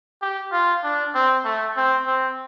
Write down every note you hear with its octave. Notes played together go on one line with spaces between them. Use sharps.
G4
F4
D4
C4
A3
C4
C4